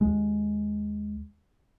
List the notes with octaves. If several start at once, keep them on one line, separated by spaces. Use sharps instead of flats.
D#2 G#3